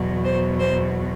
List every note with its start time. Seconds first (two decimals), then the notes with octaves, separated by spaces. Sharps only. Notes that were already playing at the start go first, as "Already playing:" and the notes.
Already playing: E2 B2 F#3
0.24 C5
0.59 C5